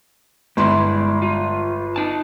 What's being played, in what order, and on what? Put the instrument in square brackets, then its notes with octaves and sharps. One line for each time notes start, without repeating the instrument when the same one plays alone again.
[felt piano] G1 C6 [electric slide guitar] G#3 E4 D5
[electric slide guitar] F4
D#4 A5